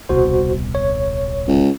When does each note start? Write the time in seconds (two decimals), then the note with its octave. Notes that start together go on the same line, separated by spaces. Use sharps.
0.09 D#1 C2 B2 F#4 C5
0.75 C#5
1.48 C#2